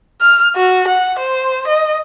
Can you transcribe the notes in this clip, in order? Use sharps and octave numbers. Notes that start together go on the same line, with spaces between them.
F6
F#4
F#5
C5
D#5